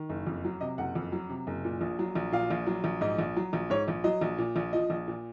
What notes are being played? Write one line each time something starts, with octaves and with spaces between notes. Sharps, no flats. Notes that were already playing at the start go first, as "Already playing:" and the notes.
Already playing: D#3
F#1
F2
F#3
C3 D#5
F#1 F#5
F2
F#3
C3
F#1
A#2
A#1
F#3
A#1
A#2 F5
A#1
F#3
A#1
G#2 D#5
A#1
F#3
A#1
G#2 C#5
A#1
F#3 D#5
A#1
A#2
A#1
F3 D#5
A#1
A#2